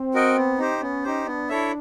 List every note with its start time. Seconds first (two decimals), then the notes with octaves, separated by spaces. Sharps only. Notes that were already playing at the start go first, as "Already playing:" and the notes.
Already playing: C4
0.14 F#4 A#4 D#5 G5
0.37 B3
0.59 D#4 G4 C5
0.81 B3 C#4
1.04 D#4 G4 C5
1.26 B3 D4
1.49 E4 A4 C#5 E5